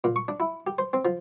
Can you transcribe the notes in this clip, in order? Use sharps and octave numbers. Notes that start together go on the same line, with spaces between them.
A#2
C#6
D4
E4
G4
C5
C4
F3